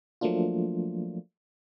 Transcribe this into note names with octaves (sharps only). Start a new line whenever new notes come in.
F3 F#3 A3 A#3 D4 F4